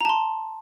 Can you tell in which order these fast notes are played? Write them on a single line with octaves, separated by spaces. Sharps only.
A#5 A5 C6